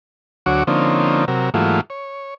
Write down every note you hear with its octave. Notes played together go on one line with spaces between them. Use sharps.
D2 F#3 F#4 C#5 D6
D3 F3 A#3 C4 C#4 D#4
C3 F#3 A#4
G#2 E3 F#3 A3 A#3 F4
C#5